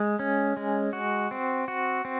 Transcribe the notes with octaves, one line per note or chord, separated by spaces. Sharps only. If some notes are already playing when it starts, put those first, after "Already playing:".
Already playing: G#3
C#4
G#3
F#4
C4
F#4
C4